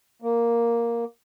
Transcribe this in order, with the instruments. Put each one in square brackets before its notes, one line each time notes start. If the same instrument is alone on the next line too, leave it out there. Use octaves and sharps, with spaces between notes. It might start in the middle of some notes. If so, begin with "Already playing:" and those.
[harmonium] A#3